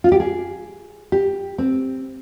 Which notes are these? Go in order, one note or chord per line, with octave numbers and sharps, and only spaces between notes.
F4
G4
G#4
G4
C4